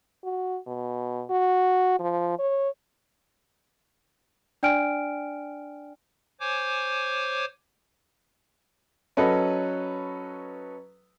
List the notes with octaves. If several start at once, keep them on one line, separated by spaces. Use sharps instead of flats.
F#4
B2
F#4
F3
C#5
D4 D5 G5 G#5 F6 D7
C5 C#5 G#5 D6
F#3 C#4 F#4 A4 B4 D#5